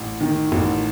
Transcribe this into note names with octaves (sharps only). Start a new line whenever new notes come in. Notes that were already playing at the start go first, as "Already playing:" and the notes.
Already playing: A1
D#3
A1